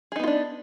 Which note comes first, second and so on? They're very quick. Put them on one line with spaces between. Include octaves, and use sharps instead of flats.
G#4 D#4 B3 F4 D4